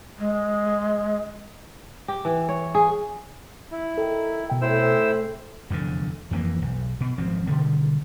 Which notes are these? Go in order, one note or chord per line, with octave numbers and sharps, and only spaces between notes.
G#3
G4
E3
C#5
G#4
E4
D#3 A4
B2 G5
A2 C4 E4 G#4 C5 E6
F1 E2 A2 D3
F2 E3 F3 A#3
B1
B2
G#1 F3 F#3 C4
B2 D3 D#3 G3